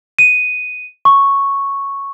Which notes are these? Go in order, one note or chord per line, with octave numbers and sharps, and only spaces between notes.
D#7
C#6